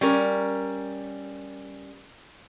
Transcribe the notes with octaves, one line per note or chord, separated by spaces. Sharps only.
G3 C#4 A#4